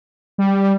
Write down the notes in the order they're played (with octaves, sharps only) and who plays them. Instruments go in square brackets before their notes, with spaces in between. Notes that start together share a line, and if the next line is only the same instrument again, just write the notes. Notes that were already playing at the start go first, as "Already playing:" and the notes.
[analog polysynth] G3